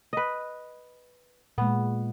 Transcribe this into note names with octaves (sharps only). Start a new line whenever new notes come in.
B4 D#5
A#2 G#3 B3